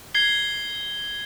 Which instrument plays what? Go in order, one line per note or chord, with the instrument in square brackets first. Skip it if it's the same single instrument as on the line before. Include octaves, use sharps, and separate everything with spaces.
[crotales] G#6 C7 G7